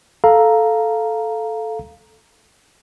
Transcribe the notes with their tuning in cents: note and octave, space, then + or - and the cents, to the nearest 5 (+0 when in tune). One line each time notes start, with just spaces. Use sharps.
A4 -5 F5 +0 A#5 +0